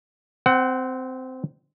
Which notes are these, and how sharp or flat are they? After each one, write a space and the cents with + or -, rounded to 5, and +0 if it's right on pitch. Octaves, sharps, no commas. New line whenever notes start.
C4 -15 F#5 +20